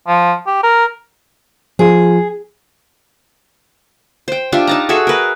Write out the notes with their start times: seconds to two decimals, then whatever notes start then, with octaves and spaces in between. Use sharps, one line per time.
0.08 F3
0.47 G4
0.63 A#4
1.79 F3 F4 G#4
4.28 C5 G5
4.52 D4 F4 G4 E5
4.67 D#4 A5 A#5
4.89 F#4 G#4 A4 E5
5.07 A#4 B4